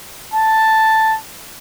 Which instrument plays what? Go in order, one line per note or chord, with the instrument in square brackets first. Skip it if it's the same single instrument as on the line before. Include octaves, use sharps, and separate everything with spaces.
[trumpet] A5